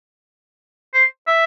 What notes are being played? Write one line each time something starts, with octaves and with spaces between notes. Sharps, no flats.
C5
E5